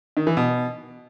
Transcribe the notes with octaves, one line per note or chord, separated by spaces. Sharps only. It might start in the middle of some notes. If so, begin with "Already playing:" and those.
D#3
E3
B2